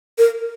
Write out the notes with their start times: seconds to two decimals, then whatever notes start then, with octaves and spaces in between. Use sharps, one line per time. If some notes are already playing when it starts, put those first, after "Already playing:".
0.18 A#4